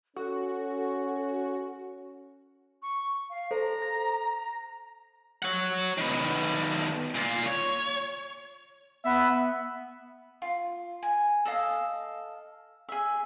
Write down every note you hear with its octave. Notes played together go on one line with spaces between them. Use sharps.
C#4 F#4 A4
C#6
F5
A4 C5 A#5
A#6
C#5 F#5
D#3 B3
A#2 F4
C#5
B3 E5
F4
G#5
A4 D#5 F5
G#4 E5